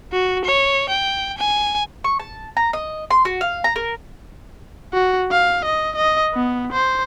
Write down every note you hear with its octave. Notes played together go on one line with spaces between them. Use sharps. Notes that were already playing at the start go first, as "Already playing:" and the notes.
F#4
C#5
G5
G#5
C#6
A5
A#5
D#5
C6
F#4
F5
A#5
A#4
F#4
F5
D#5
D#5
B3
C5